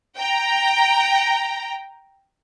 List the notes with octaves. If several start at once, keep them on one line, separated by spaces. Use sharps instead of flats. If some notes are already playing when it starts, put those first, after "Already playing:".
G5 A#5